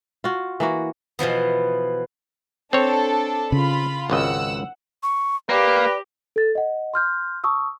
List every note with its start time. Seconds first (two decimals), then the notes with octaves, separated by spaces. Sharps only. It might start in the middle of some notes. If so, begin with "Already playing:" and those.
0.24 F4 F#4
0.60 E3 A#3 F#4
1.19 B2 E3 F3 B3
2.73 C4 D4 A4 C#5
3.52 C#3 F4 B5
4.10 G#1 C#2 D#5 F#5 E6
5.03 C#6
5.49 A#3 G4 B4 D5
6.36 A4 A6
6.55 D#5 F#5
6.94 C6 F6 G6
7.44 A5 C#6 D#6 E6